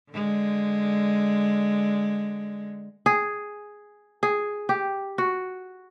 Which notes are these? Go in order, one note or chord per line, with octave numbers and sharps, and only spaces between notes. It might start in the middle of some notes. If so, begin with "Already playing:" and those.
D3 G#3
G#4
G#4
G4
F#4